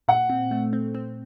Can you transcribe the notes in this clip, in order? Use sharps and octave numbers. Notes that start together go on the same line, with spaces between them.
A#2 F#5
C4
A3
C4
C4